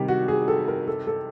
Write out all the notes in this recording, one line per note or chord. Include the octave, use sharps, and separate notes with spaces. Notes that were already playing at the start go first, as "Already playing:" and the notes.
Already playing: C3 D#3 G3 G4
F#4
G#4
A4
A#4
A4
A4